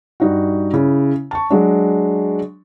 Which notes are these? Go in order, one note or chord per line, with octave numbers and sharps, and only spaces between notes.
G2 D#4 F#4
C#3 E4
A5 C#6
F#3 G#3 D4